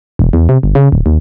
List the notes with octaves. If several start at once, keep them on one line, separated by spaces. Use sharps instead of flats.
E1
E2
C3
G1
C#3
D1
D#2